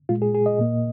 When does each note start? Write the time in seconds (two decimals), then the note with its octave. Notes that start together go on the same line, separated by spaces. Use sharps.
0.09 A#2 G#3 F4
0.22 G#4
0.35 G#4
0.46 D#5
0.59 A#2 A#3